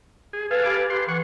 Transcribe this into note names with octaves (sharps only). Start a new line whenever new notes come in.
G#4
A4 B4 F5 G#5
G4 B5 D6
G4 B4 C6
E3 F#5 C#6